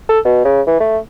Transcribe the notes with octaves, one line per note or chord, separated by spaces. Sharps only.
A4
B2
C#3
E3
A3